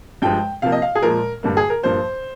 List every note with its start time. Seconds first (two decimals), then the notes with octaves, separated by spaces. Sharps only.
0.22 G2 F3 G#3 G5
0.62 C3 F3 A#3 F5
0.72 D#5
0.82 F5
0.95 G#4
1.02 A#2 F3 G#3 A#4
1.43 G2 D3 G3 A#3
1.57 G#4
1.70 A#4
1.83 G2 F3 A#3 C5